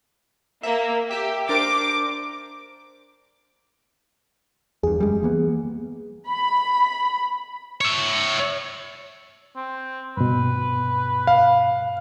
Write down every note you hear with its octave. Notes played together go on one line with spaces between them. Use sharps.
A#3 E5
G4 E5
D4 A#4 C5 D6
E2 G2 G#4
F#2 G3 G#3
E3 A#3 B3
B5
C#5 E5
C4
G2 B2 B4
F5